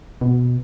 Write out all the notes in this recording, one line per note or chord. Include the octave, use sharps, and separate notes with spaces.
B2